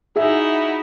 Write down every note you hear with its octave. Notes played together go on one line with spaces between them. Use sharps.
D#4 E4 F#4 G#4 E5